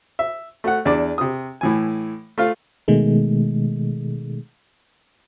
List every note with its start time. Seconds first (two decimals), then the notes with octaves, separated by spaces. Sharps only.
0.19 E5
0.64 A3 F#4 F#5
0.85 E2 D4 D5 D6
1.18 C3 D#6
1.61 A2 E3 G#5
2.38 A3 F4 F5
2.88 B2 D#3 G#3 A3